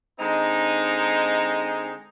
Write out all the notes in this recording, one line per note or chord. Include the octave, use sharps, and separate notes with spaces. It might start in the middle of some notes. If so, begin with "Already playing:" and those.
D3 G#3 C4 D#4